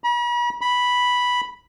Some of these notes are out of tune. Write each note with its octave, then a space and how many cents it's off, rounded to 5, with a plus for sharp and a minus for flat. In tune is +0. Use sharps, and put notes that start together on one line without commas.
B5 -45
B5 -5